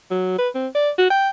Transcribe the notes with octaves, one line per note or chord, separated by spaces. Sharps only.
F#3
B4
C4
D5
F#4
G5